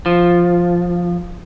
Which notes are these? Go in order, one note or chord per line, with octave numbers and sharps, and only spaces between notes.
F3